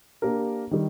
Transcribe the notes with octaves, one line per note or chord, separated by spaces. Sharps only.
A#3 D4 G4 A#4
D#3 G3